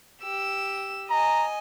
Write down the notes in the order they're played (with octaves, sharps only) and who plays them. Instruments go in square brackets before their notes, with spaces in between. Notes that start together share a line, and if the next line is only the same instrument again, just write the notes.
[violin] G4 E6
[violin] D#5 G#5 [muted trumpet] A#5